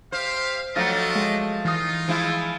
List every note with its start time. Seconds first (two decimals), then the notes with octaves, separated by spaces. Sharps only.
0.12 G4 C5 E5 F5
0.76 F3 F#3 A3 D4 D#5 F6 A6
1.16 G#3
1.65 E3 D#4 F4 D#6
2.08 F3 G#3 E4